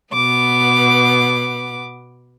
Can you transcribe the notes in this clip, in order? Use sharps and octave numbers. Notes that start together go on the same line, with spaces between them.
B2 B3 D6